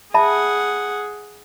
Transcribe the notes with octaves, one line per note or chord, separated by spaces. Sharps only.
G#4 E5 F#5 A5 B5